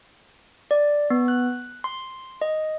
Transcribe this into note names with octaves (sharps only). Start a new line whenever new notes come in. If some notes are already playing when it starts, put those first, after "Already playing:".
D5
B3
F#6
C6
D#5